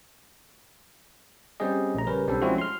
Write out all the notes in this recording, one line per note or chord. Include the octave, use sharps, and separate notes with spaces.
G3 C4 C#4 G#4 D#5
A#1 A3 A#5
C#3 G3 C#4 A#4 B4
B1 G3 C4 D4 A4
F3 G#3 C4 C#4 E4 F#4
C6 F6